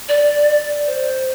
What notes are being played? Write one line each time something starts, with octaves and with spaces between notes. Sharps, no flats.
D5
C5